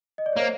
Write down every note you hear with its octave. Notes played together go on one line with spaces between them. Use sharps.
D#5
D5
C#5
A#3 C5